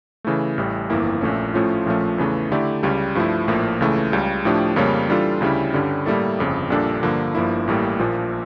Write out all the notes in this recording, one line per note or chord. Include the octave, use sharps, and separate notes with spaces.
C#3 E3 A3
A1 A2 G3
G1 F2 E3 A#3 E4
A#1 A#2 A3 C#4
A2 F3 A3 C#4 F4
A#1 A#2 F3 A3 C#4
E2 C#3 E3 A3
D3 A3 E4 G4 D5
C#2 C#3 G3
G2 F3 A3 E4
A#1 A2 F3 A#3
C#2 C#3 E3 A3
C#2 C#3 G3
A2 F3 A3 D4 G4
F2 C#3 G3 A#3 C#4
E3 G3 D4 F4 A4
D2 C#3 G3 C#4 E4
G2 D3 G3 C#4
A2 G3 A#3 E4 A4
G1 F2 C#3
A#1 A#2 G3 D4 A4
G2 D3 F3 A#3
G1 G2 F3 A#3 E4
A1 A2 G3 A#3
A#1 A#2 F3 A#3